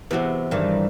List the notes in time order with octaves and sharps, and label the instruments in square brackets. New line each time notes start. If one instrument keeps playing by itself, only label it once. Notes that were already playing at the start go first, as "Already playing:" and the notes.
[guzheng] E2 C3 [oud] B3 F#4
[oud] G2 D#3 E3